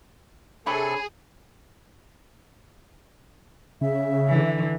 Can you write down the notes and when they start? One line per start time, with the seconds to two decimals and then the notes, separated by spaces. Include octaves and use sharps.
0.66 C3 D4 G#4 A4 C#5 B5
3.81 C#3 E5
4.29 D3 E3